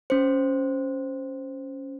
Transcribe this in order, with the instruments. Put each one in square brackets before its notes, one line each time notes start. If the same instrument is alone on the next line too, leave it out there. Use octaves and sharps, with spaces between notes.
[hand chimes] C#4 C5